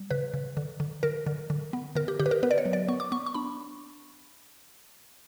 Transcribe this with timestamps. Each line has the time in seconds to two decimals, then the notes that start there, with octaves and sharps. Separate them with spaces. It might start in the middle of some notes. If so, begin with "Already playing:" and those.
Already playing: G3
0.11 C#3 B4
0.34 C#3
0.57 D3
0.80 D3
1.03 D3 A#4
1.26 D3
1.50 D3
1.73 B3
1.95 D3 A#4
2.08 G4
2.19 D3 G4
2.26 B4
2.31 A#4
2.43 B3 B4
2.51 D5
2.58 C#5
2.65 F#3
2.73 D5
2.88 B3 C#6
3.00 D6
3.12 B3 C#6
3.26 C#6
3.34 D4 B5